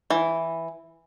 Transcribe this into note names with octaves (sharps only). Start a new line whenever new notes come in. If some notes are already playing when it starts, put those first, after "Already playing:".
E3